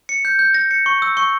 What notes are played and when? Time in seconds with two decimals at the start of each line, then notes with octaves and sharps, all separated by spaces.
0.09 C#7
0.25 G6
0.39 G6
0.54 A#6
0.71 C#7
0.86 C#6
1.02 E6
1.17 C#6